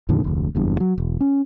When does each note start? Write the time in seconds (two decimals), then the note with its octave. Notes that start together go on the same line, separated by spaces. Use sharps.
0.09 F2 A#2 D3 D#3
0.24 F1 D2
0.55 F#1 E2 G2
0.80 F#3
0.98 E1
1.20 C#4